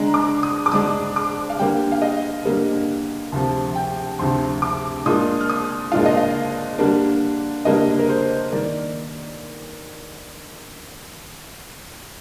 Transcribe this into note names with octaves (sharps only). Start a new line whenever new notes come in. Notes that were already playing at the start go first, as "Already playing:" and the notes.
Already playing: D3 G#3 D4 A#5
D6
D#6
D6
D3 G#3 D4 D#6
D6
F5
D3 G3 A#3 G5
F5
D#5
D3 G3 A#3
D2 C3 F3
G5
D2 C3 F3 C6
D6
A#2 G#3 D4 F4 D#6
F6
D#6
A#2 G#3 D4 F4 F5
D#5
F5
D3 G3 A#3 D4
D3 G3 A#3 D4 D#5
A#4
C5
D#3 A#3 D5